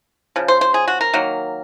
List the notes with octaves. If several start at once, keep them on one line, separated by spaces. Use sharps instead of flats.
C#3 F3
C5
C5
G#4
F#4
A#4
D#3 F#3 A#3